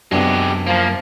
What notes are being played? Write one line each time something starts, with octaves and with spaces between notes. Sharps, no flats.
F#2 C3 G#3 B3 D4 F#4 G4
F3 A#3